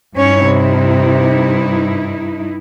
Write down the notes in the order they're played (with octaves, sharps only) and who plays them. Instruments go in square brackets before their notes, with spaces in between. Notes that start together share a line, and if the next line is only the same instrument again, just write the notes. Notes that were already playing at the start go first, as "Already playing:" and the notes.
[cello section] G2 D#4 E4 [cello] C#4 C#5
[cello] C3